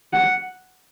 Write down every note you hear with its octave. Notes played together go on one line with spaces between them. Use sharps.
F#5